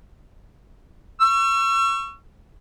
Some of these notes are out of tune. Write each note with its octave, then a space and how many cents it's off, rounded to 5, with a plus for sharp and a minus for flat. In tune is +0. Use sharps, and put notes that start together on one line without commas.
C#6 +0 E6 +40